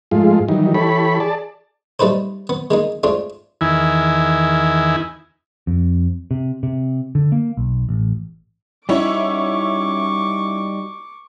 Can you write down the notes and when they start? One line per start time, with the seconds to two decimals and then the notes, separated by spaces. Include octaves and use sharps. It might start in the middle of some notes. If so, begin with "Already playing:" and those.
0.11 G#2 F3 G#3 A3 F4
0.48 D#3 E3 F#3 G3 D#4
0.74 E3 G4 A4 C#5 B5
1.20 G#4 D5 A5
1.99 G3 A3 D#4 B4 C5
2.49 B3
2.70 G#3 A#3 D#4
3.03 G#2 A3 D4 F4
3.61 E2 D#3 E4 G#5
5.67 F2
6.31 C3
6.63 C3
7.15 D3
7.32 A#3
7.57 B1
7.89 A1
8.89 G3 C#4 D#4 E4 F#4 C#5 C#6 D6